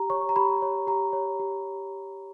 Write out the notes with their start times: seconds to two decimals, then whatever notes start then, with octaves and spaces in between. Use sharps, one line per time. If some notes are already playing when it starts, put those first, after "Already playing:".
Already playing: G4 A#5
0.10 C#5 C#6
0.29 A#5
0.36 G4 B5
0.62 C#5
0.87 G4 A#5
1.13 C#5
1.40 G4